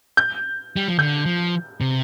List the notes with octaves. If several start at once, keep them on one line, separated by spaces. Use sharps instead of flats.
G6
G3
F3
D3 G6
F3
C3